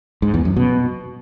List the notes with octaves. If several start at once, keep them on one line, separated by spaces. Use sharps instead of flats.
G#2
E2
F#2
B2